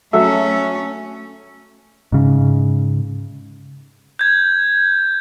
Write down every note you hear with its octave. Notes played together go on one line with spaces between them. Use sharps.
F#3 A3 C#4 A4 E5
G#2 C#3
G6 G#6